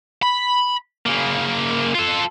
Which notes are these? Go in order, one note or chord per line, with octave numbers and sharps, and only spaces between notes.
B5
C#3 A#3
F4 A4